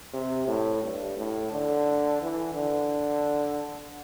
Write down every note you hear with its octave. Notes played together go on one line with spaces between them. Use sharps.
C3
A2
G2
A2
D3
E3
D3